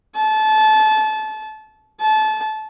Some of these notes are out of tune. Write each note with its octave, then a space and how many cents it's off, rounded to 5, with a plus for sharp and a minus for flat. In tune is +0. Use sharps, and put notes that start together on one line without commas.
A5 -25
A5 -25